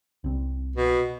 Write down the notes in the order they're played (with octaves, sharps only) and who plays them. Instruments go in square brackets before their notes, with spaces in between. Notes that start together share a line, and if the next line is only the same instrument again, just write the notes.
[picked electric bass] C2 C4
[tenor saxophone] B2